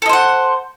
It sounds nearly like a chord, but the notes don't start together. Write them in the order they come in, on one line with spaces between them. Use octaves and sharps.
A4 D#5 C5 F#5